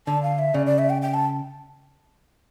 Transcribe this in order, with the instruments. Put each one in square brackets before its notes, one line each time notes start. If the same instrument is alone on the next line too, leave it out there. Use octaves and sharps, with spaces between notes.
[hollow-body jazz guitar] D3 [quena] A5
[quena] F5
E5
[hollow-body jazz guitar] C#3 [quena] D5
[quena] D5
E5
G5
G5
A5